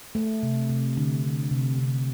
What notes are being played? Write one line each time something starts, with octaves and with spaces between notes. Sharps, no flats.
A3
C3
C3
D3
D3
C3
C3